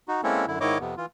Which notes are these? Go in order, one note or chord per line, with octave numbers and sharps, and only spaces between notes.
D#4 F#4
G#3 A#3 C4 C#4 E4 A4
F#2 D3 E4
G#2 D#3 E4 C#5 D#5 D6
F2 C3 B3
E3 F4